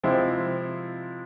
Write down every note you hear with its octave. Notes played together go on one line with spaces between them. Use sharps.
C3 F3 G#3 C4 E4